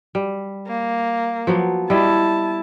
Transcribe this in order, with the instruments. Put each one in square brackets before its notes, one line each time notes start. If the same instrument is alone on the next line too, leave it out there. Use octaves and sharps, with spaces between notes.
[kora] G3
[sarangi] A#3
[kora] F3 F#3 B3
[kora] G3 D#5 [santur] E4 [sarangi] A5